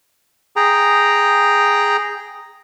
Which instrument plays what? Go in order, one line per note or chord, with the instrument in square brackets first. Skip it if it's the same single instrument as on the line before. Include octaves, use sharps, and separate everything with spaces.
[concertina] G#4 G5 A#5